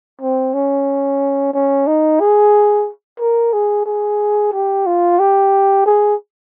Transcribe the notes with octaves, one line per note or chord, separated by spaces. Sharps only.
C4
C#4
C#4
D#4
G#4
A#4
G#4
G#4
G4
F4
G4
G#4